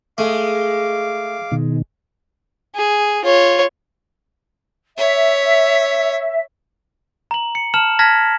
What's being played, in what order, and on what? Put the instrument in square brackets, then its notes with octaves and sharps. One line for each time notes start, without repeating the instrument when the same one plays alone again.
[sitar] G#3 G#4 [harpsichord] A3 [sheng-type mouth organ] F5 D6
[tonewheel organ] B2 D#3
[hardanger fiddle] G#4
F4 C#5
[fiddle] C#5 [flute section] E5
[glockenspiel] A#5 F#7
C#7
A5 F6 E7 F#7
A5 F6 G#6 A#6 B6